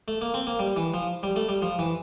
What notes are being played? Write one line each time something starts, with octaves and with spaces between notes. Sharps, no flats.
A3
A#3
C4
A#3
G3
E3
F3
G3
A3
G3
F3
E3